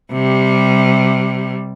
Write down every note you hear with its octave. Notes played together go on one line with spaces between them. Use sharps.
C3 G3